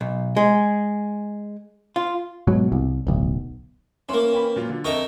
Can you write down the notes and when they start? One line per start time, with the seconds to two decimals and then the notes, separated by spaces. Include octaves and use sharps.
0.01 B1
0.37 G#3
1.96 F4
2.47 G#2 B2 F#3
2.72 C2
3.07 D1 B1
4.09 E3 A#3 C#4 C6
4.33 C#4 G5 B5
4.56 A#2 F#3 F4
4.69 D3
4.84 F2 D#4 A4 A#4 E5 C#6